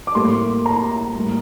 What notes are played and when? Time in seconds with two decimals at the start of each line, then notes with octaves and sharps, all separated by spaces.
0.07 D6
0.15 A2 G3 A#3 C6
0.66 A#5
1.15 A2 G3 A#3